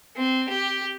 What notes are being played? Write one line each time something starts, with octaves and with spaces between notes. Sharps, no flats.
C4
G4